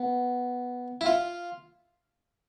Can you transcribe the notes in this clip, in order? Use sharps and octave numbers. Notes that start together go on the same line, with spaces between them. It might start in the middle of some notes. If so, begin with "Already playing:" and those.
Already playing: B3
E4
F4